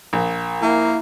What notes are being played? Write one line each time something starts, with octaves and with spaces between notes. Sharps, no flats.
A#1
A#3 E4